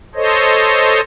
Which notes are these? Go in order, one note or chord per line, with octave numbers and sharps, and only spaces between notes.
A4 C5 C#5 D#5